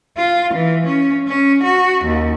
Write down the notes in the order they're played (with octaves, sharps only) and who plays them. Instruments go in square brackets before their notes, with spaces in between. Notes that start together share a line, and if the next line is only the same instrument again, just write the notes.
[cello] F4
E3
C#4
C#4
F#4
D#2